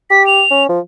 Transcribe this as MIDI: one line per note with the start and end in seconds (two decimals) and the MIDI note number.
0.10 0.43 67
0.10 0.25 95
0.27 0.64 101
0.51 0.67 61
0.69 0.79 53